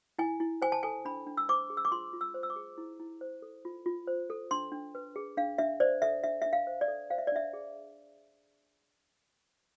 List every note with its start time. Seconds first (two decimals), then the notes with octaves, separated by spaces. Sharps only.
0.19 E4 G#5
0.40 E4
0.62 C5 G#5
0.72 A5
0.83 A4 G#5
1.05 D4 B5
1.27 D4
1.37 E6
1.49 C5 D6
1.70 G#4
1.77 E6
1.85 D6
1.91 F4 C6
2.13 F4
2.21 E6
2.34 C5
2.43 E6
2.50 D6
2.56 G#4
2.78 E4
3.00 E4
3.21 C5
3.42 A4
3.65 F4
3.86 F4
4.07 C5
4.30 A4
4.51 D4 C6
4.72 D4
4.95 B4
5.16 G#4
5.37 D4 F5
5.58 D4 E5
5.80 C5 D5
6.02 A4 E5
6.23 D4 E5
6.42 D4 E5
6.53 F5
6.67 C5
6.81 D5
6.88 A4
7.10 C5 F5
7.18 E5
7.27 D5
7.32 D4 E5
7.53 G#4